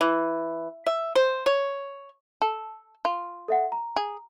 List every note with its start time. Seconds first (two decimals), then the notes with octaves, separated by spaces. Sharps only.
0.01 E3
0.86 E5
1.15 C5
1.46 C#5
2.42 A4
3.05 F4
3.48 A4 E5 F#5
3.72 A#5
3.96 G#4